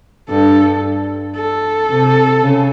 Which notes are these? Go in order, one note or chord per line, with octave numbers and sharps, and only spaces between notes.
G2 A4
A4
C3
C#3